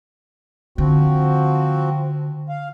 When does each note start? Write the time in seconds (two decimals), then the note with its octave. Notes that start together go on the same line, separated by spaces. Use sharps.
0.78 D3 F3 C4 F#4
2.49 F5